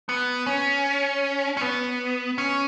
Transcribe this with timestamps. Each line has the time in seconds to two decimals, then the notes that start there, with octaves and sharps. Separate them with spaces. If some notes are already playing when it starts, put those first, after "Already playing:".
0.09 B3
0.46 C#4
1.57 C#4
1.61 B3
2.38 C#4